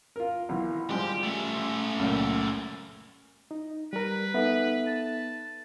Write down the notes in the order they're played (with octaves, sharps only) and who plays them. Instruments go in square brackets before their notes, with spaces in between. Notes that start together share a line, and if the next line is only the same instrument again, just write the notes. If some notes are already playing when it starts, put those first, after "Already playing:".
[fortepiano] F4 A#4
B1 E3
[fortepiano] F3 G3 G#3 [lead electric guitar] G4
[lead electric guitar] A3 C#4
[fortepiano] C#2 F#2 A#2
[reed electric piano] D#4
[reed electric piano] G3 A#4 [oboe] B4
[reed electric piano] B3 [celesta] D#4 A4 E5
[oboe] A5